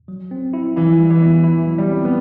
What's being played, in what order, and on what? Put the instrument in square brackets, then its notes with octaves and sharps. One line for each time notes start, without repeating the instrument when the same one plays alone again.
[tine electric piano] F#3
C4
E4
[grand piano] E3 [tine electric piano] E4
[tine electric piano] G3
[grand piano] E3
[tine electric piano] B3
E4
F#3
[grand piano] G3
[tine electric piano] C4
[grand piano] B3